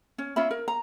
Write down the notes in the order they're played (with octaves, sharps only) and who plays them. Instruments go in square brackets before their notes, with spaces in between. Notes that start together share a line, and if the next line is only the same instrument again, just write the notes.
[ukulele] C#4
C#4 F4 E5 B5
A#4
A#5